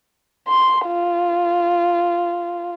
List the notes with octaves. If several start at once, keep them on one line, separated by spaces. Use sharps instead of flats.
C6
F4